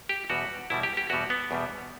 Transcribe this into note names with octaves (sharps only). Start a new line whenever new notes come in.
G4
E2 B2 G3 F#4
E2 B2 G3 E4
G4
G4
E2 B2 G3 F#4
B3
E2 B2 G3